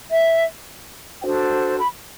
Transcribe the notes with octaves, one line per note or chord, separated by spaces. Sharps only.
E5
D4 F#4 A4 C5 G5
B5